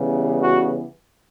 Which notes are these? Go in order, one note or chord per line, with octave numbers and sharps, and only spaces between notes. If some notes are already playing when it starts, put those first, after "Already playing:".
Already playing: C#3 E3 G3 B3
F#4